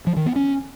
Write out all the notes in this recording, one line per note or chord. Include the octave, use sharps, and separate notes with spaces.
F3
D#3
B3
C#4